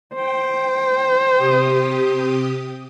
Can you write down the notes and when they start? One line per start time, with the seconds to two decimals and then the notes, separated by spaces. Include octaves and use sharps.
0.15 C5 G5
1.38 C3 G4 D#6